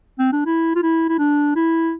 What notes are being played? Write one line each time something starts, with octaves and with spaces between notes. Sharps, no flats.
C4
D4
E4
F4
E4
E4
D4
E4